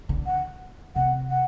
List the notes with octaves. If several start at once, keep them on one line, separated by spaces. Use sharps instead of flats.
D3
F#5
C3 F#5
F#5